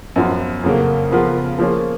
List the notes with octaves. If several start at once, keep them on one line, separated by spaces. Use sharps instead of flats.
F#2 F3 B3
F2 C#3 F#3 A#3
C#3 F3 B3 F4 A#4
F3 A#3 C#4 G#4